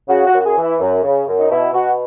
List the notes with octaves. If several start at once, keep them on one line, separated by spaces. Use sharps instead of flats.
C#3 F#4
F#4
F#2
F#4
G#4
E3
E4
F#2
C#3
F#2
D#4
B2 E4
B2 F#4